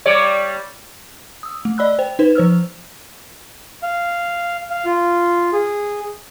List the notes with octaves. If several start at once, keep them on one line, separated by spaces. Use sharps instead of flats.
G3 C#5 D5
D#6 E6
A3
D5 D#5 B5 E6 F#6
C5 G5
D#4 B4 C5
F3 C5 E6 F6
F5
F5
F4
G#4